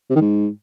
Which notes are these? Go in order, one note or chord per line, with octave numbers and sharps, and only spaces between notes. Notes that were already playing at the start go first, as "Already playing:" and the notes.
C3
D#3
G#2